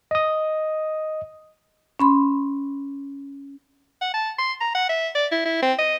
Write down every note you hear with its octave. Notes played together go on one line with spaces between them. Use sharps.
D#5 D#6
C#4 B5 C6
F#5
A5
C6
A#5
F#5
E5
D5
E4
E4
C4
D#5